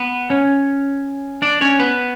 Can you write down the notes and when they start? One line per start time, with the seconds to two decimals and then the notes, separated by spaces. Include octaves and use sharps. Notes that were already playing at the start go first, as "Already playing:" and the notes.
Already playing: B3 B4
0.30 C#4 C#5
1.42 D4 D5
1.61 C#4 C#5
1.79 B3 B4